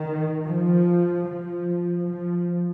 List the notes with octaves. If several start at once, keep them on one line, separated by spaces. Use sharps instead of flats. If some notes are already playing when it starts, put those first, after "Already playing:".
Already playing: D#3
F3
F3
F3